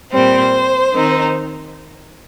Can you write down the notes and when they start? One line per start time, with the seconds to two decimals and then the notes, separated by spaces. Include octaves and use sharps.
0.13 A#2 G3 C4 C5
0.93 D#3 C4 D#4